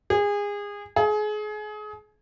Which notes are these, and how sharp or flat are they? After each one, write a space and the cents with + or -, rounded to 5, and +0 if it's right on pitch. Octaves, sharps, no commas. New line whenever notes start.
G#4 -25
G#4 +30